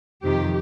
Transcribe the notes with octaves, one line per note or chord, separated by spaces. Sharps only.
F2 C3 D#3 G4